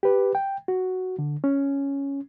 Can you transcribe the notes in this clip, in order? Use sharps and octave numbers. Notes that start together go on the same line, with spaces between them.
G4 B4
G5
F#4
D3
C#4